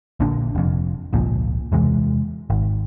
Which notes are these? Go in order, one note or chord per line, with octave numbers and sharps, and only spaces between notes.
A#1 A#2 D3 D4
F1 F2
G#1 C#2 A#2 F3
E2 C3 E3 G#3
G#1